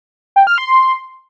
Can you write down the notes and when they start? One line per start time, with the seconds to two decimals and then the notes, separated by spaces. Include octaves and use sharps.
0.36 G5
0.47 F6
0.58 C6